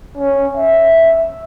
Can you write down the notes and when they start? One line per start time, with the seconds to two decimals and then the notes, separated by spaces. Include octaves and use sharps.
0.17 C#4
0.57 E5